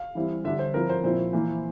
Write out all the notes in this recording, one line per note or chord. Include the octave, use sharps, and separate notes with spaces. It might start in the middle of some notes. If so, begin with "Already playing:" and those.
Already playing: F5
E3 G3 C4 E4
D3 G3 D4 E5
C5
F3 C4 E4 A#4
C5
A#2 F3 C4 E4 C5
E3 A#3 E4